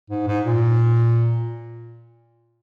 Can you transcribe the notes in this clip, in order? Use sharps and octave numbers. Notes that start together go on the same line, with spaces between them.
G#2
G#2
A#2